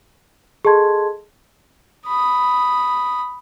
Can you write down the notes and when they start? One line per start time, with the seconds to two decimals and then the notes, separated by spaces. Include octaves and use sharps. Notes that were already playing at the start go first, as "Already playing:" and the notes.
0.65 G#4 A4 D#5 A5 C6 G#6
2.07 B5 D#6